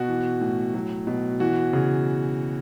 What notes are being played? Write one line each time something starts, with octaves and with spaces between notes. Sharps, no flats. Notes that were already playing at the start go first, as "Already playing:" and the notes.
Already playing: B2 F#4
E3
A2
F#3
B2
E3 F#4
C#3